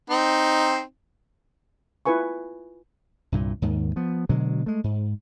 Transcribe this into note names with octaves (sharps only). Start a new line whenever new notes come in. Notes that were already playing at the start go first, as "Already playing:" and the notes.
C4 D#4
E4 F4 B4 G#5 C#6
C2 G2 A#2
D#2 G#2 D#3
F3 B3
B2 D3 F#3 G#3
G#3 A3
G#2